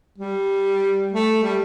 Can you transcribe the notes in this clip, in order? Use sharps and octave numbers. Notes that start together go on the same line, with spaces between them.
G3
A3
G3